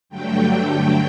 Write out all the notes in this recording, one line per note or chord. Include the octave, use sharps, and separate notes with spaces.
G2 D3 F#3 A3 G5